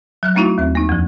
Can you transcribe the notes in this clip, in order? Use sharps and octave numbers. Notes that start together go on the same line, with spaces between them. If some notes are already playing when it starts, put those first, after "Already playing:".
F#3 F6 F#6
G3 A3 C#4 D#4 E4 F#4
D#2 C4
A#3 D#4
F2 F3